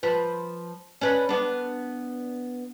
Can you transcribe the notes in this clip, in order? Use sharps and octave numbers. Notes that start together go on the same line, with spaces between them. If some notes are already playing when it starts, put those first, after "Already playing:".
F3 B4
C#4 D4 B4
B3 D4